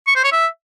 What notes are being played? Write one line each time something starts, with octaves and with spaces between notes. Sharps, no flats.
C#6
C5
C#5
E5